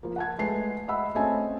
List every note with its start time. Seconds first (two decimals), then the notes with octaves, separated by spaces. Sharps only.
0.03 F3 A#3
0.16 F#5 A5 G#6
0.38 G#3 A3 B4 A5 C7
0.88 D#5 E5 F#5 B5 E6
1.15 A3 C4 C#4 D#5 G#5 A5